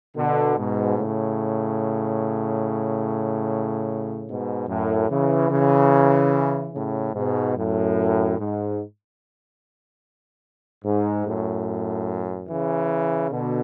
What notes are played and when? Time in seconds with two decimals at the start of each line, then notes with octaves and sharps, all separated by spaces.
0.16 B2 D3
0.57 G#2 B2
0.98 A2 C#3
4.27 G#2 B2
4.68 F#2 A2
5.09 C#3 E3
5.50 C#3 E3
6.74 A2 C#3
7.15 G#2 B2
7.56 F#2 A2
8.38 G#2
10.85 G#2
11.26 F#2 A2
12.49 C#3 E3
13.32 B2 D3